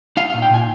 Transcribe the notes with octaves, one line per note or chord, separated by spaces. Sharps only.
D#4 F5
F5
A#2
G5
A#2 G#5